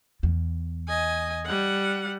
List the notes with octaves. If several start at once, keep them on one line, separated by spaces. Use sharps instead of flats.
E2
D#5 G#5
G3 F#5